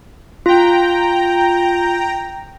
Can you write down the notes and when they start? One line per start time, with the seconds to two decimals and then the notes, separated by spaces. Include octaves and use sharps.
0.46 F4 G5 A#5